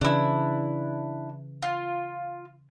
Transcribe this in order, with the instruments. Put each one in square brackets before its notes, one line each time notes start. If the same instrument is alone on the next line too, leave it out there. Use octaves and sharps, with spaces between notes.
[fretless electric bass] C#3 E3 [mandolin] D4 E4
[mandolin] F4